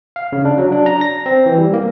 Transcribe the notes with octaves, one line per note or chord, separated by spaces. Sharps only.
F5
C#3
D4
F#3
D4
A#5
A#6
C4
E3
G3
A#3